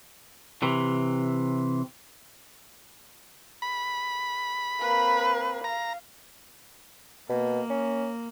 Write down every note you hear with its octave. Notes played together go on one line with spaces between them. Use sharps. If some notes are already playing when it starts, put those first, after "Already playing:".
C3 E3
B5
A#3 C4 B4
F5 A#5
B2 A#3
C#4